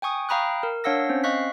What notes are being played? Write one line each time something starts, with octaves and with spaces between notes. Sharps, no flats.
G5 G#5 C#6 D#6
F5 G5 A#5 B5 D#6 F#6
A#4
D4 C#5 F5 F#5 E6 A#6
C4 C#4 C5
D#5 F5 C#6 F#6 B6